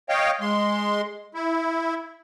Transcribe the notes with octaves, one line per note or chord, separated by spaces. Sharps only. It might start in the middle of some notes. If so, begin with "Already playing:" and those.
C#5 D#5 F5 G5
G#3 C6
E4